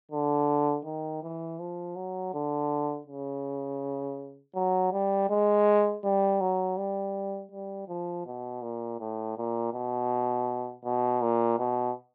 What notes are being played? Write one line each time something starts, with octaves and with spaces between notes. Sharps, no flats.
D3
D#3
E3
F3
F#3
D3
C#3
F#3
G3
G#3
G3
F#3
G3
G3
F3
B2
A#2
A2
A#2
B2
B2
A#2
B2